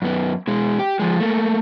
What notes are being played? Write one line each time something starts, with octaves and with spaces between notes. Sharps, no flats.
F#2 B3
B2 G#3
G4
F3 G#3
A3 A#3